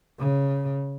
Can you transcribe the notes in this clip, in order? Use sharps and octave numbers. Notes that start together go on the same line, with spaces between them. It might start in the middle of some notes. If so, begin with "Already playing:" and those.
C#3